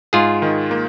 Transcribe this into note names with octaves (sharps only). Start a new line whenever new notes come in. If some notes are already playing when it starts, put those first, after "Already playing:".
G#2 F4 G#4
D#3
A#3